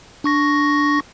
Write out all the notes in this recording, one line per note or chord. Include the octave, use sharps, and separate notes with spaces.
D4 C#6 A#6